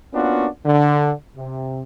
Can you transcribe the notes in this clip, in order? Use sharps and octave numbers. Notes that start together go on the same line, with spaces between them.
A#3 B3 C#4 D4 F4 F#4
D3
C3